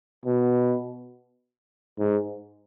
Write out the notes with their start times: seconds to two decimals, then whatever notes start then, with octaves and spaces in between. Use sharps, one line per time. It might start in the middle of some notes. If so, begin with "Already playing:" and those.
0.25 B2
1.99 G#2